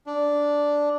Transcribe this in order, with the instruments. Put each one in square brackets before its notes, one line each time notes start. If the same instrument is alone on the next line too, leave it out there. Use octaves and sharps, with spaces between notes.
[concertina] D4